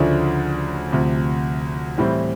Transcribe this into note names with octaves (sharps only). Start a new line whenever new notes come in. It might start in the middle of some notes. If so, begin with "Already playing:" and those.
Already playing: D2 C#3 F3 A3 D4
D2 C3 F3
A2 E3 G3 C4